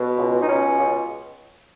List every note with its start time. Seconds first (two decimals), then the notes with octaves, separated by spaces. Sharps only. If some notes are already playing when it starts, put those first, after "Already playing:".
Already playing: B2
0.17 C#2
0.41 D#4
0.47 B2 C#4
0.78 C#2